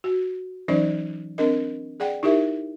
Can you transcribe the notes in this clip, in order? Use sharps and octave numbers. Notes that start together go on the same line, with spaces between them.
F#4
E3 F#3 C#4 D#4 C5 D5
C4 D4 A#4 D#5
G#4 D5 F#5 G5
D#4 E4 G4 A#4 E5